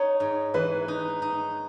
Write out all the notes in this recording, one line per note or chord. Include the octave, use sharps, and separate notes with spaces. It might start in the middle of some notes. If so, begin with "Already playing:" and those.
Already playing: D#4 C#5
G#2
E3 B4
D#4
D#4